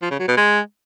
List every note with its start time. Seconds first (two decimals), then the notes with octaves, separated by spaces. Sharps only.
0.02 F3
0.11 C#3
0.20 F#3
0.28 B2
0.37 G#3